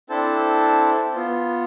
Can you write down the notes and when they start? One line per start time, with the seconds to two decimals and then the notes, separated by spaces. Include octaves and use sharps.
0.10 C4 D4 E4 A4 C5 A5
1.15 B3 F4